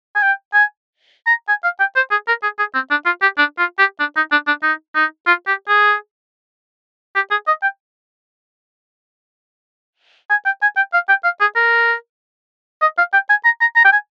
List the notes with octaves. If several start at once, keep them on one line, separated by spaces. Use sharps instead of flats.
G#5
G5
G#5
A#5
G#5
F5
G5
C5
G#4
A#4
G#4
G#4
C4
D4
F4
G4
D4
F4
G4
D4
D#4
D4
D4
D#4
D#4
F4
G4
G#4
G4
G#4
D#5
G5
G#5
G5
G#5
G5
F5
G5
F5
G#4
A#4
D#5
F5
G5
G#5
A#5
A#5
A#5
G5
G#5